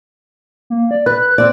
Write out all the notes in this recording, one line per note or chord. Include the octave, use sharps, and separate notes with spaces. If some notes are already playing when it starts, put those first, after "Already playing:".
A#3
D5
B4 F#6
C4 D5